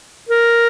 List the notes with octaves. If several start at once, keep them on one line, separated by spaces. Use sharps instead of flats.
A#4